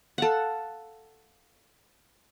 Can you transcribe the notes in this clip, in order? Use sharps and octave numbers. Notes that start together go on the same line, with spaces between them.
A4 F5 F#5